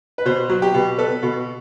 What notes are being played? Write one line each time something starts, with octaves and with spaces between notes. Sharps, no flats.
B4
B2 C5
F#3
G4
B2
B3 A4
B2